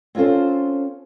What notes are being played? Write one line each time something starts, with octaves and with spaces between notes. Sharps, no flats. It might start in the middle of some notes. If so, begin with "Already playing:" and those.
C4 C#4 F4 A4 C5